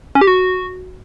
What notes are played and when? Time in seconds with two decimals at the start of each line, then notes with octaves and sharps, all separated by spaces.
0.15 C#4
0.21 G4
0.27 F#4